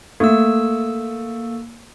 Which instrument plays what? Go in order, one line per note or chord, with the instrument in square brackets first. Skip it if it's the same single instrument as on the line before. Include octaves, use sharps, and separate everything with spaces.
[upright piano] A3 [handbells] A#3 E6